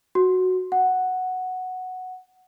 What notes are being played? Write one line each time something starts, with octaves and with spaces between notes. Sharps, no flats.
F#4
F#5